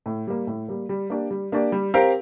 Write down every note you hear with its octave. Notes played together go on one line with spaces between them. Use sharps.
A2
G3 A#3
A2
G3 A#3
G3
A#3 D4 G4 D5
G3
A#3 D4 G4 D5
G3
C4 G4 A#4 F5